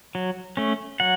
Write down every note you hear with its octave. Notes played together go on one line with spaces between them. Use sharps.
F#3
A3 C#4
F#3 F#5